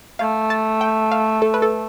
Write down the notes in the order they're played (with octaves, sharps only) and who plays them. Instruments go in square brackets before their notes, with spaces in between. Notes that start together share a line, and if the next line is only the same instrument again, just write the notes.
[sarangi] A3 [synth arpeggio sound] F5
[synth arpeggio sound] A5
G5
F5
A4
B4
A4